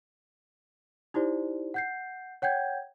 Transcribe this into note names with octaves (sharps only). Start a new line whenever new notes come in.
D#4 E4 G4 C5 D5
F#5 G6 C7
C#5 F#5 G5 G6 G#6